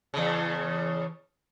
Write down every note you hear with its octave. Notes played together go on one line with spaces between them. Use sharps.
E2 C#3